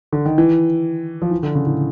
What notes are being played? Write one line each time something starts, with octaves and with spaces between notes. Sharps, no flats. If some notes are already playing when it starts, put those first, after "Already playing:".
D3
D#3
E3
F3
E3
D3
C#3
A2